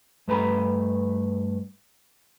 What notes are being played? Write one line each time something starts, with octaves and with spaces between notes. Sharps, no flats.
G2 A3 B4 A#5 B5